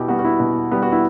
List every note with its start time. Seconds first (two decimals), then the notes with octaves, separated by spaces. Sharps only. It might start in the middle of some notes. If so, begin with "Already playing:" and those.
Already playing: B2 E4 G4
0.08 G3 B3 F#4
0.19 F#4
0.25 E4
0.40 B2
0.72 G3 B3
0.82 F#4
0.92 E4